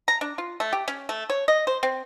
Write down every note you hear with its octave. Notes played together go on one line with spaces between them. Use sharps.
A#5
D4
F4
A3
G4
C#4
A3
C#5
D#5
C5
C4